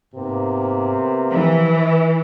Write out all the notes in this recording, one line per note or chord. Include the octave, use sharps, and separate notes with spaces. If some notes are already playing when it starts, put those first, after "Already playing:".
G#2 C3 A#3 B3
E3 F3